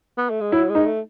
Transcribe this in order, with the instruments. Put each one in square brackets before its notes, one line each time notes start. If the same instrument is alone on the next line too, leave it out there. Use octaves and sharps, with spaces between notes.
[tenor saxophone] B3
A3
G#3
[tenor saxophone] F#3 [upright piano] E4
[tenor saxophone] G#3
[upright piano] D#4
[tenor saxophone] A3